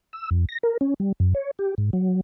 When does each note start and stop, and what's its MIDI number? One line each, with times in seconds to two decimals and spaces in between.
0.13 0.29 88
0.31 0.45 41
0.49 0.58 94
0.63 0.77 70
0.81 0.94 61
1.00 1.12 55
1.20 1.34 42
1.35 1.51 73
1.59 1.75 67
1.78 1.90 44
1.93 2.21 54